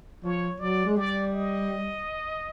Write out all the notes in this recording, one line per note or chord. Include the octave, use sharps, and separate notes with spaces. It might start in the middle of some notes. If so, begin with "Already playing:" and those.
F3 C#5
F#3 D5
G#3
G3 D5
D#5